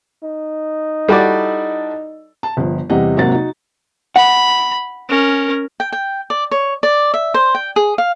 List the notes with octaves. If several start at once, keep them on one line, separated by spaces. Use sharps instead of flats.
D#4
G3 E4 F#4 A4 D5
A5
G1 F3
E2 C3 G3 D#5 F#5
G#1 C3 F#3 A#3 F#5 A6
D#4 F#4
F#5 B5
C#4 A#4
G5
G5
D5
C#5
D5
E5
C5
G5
G#4
F5